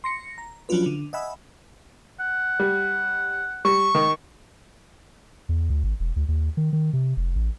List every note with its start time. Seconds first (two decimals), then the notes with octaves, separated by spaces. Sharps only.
0.04 C6 A#6 C#7
0.38 A#5
0.69 F3 F#3 C#4 D4 F4 B4
0.86 D3
1.13 D#5 E5 F#5 G#5 B5 E6
2.20 F#5
2.60 G3
3.65 G3 C#6
3.95 D#3
5.49 E2
5.70 D2
5.84 G#1
6.00 E1
6.16 D2
6.28 D#2
6.57 D#3
6.73 D#3
6.93 C3
7.17 F1
7.35 A1